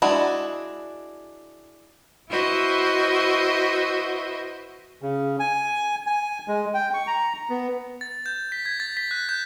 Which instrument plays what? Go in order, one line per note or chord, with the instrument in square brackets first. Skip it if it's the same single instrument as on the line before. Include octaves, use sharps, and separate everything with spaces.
[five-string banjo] G#3 D4 E4 F#4
[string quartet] E4 F#4 B4 C5 D#5 E5
[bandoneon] C#3
G#5
G#5
G#3
G5
C#6
A#5
B3
[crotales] A6
G6
B6
G#6
A6
B6
F#6
G6